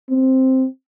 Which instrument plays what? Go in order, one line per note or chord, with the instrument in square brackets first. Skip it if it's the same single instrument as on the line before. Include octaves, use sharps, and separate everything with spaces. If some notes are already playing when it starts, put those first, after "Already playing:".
[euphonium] C4